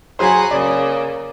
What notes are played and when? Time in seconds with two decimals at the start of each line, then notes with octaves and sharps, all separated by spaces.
0.19 F#3 G#4 C5 F#5 G#5 B5
0.51 C#3 A#3 D5